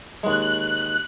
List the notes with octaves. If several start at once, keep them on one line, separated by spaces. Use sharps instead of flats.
D#2 G#3 F#6